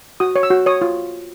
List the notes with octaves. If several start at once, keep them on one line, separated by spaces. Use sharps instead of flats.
F#4 D#6
C#5
E6
F#4
C#5 D#6
F4